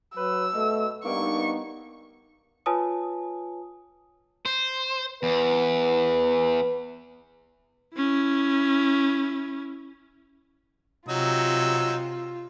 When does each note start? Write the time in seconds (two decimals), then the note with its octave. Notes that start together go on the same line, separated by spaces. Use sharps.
0.17 F#3 B4 E6
0.54 B2 A3
1.05 G2 A#3 B3 D#4 C#6
2.66 F4 B4 C#5 G#5 A5 D#6
4.45 C5
5.23 E2 B4
7.96 C#4 E4
11.08 C3 F#3 D#4 F4 E6